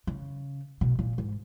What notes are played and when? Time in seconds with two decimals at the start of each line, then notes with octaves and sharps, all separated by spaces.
0.07 C#3
0.81 B2
0.99 A#2
1.18 G#2